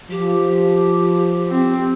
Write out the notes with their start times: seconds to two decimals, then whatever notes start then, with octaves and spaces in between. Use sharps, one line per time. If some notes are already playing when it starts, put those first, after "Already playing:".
0.11 F3 G4
1.49 C4